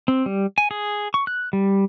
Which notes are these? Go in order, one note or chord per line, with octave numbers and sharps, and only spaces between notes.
C4
G3
G#5
G#4
C#6
F#6
G3